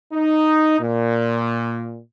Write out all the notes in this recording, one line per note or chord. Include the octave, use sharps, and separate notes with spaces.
D#4
A#2